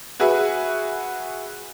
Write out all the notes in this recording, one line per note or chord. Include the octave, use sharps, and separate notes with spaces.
F#4 G#4 B4 E5